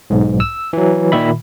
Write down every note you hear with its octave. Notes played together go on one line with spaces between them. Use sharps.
B1 G#2
E6
E3 F#3
A#2 D#3 E5 B5